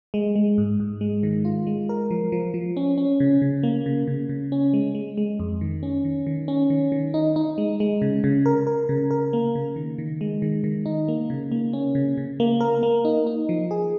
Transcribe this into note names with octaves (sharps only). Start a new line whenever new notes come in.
G#3
G#3
G#2
G#2
G#3
D#3
F4
G#3
A#4
F3
F3
F3
C#4
C#4
C#3
C#3
A#3
C#3
C#3
C#3
C#4
G#3
G#3
G#3
F2
D#3
C#4
D#3
D#3
C#4
D#3
D#3
D#4
D#4
G#3
G#3
C#3
C#3
A#4
A#4
C#3
A#4
A#3
C#3
D#3
D#3
G#3
D#3
D#3
D#4
A#3
C#3
A#3
C#4
C#3
C#3
A#3
A#4
A#3
D#4
D#4
F3
G#4